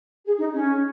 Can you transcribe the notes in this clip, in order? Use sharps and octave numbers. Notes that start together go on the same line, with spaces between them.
G#4
D#4
C#4